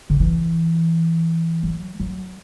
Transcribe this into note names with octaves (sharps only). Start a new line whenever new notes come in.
D3
E3
F#3
F#3